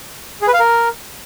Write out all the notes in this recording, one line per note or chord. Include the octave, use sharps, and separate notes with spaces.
G#4
B4
F5
A#4